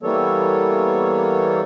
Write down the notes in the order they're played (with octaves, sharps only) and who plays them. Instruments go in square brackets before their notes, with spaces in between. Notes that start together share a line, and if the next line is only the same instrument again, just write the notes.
[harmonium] E3 G3 A#3 B3 A4 C#5